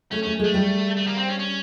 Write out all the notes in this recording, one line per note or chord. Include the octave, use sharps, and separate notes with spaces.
A3 C#4
A3 C#4
G#3 A3
G3
A3
A#3
C4
C#4
C#4